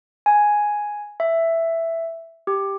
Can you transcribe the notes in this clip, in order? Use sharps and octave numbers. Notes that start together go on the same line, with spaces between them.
G#5
E5
G4